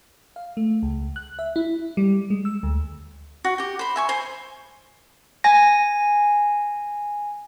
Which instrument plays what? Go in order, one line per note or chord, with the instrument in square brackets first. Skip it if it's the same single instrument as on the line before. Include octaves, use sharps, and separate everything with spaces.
[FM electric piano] F5
A3
C#2
F#6
E5
E4
G3
G#3
E6
D2
[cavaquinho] F#4
G4 G5
C5 B5
E5 G#5 C#6
C5 G#5
[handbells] G#5 A#6